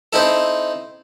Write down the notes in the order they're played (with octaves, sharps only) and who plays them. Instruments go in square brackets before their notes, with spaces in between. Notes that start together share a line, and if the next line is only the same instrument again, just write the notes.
[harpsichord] C4 D#4 E4 A4